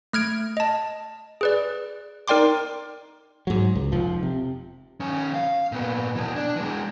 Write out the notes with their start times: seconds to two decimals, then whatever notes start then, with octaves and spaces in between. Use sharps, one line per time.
0.13 A3 F6 G#6 D7
0.57 D#5 A5
1.41 G#4 B4 D5
2.28 D#4 A#4 D5 G5 C6 D6
3.47 G#2 F#3
3.75 C#2
3.92 F1 F3
4.23 C3
5.00 D#3 C#4
5.34 F5
5.72 A#2 B3
6.15 B2 E3
6.36 D4
6.56 E3 G#3